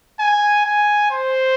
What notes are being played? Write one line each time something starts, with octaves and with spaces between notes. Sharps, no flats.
G#5
G#5
C5